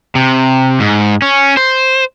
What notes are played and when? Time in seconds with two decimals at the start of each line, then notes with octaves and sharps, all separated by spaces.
0.15 C3
0.80 G#2
1.22 C#4
1.57 C5